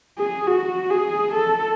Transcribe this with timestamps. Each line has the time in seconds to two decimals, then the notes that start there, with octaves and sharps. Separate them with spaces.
0.18 G#4
0.47 F#4
0.90 G#4
1.34 A4